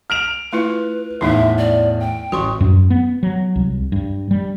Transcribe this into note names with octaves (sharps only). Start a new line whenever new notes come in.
F6 D7 F7
A3 E4 F4 B4
E2 A2 A3 D#4 E4 E5
D5
G5
A1 F#4 C6 C#6
F#2
B3
F#3
C2
G2
G3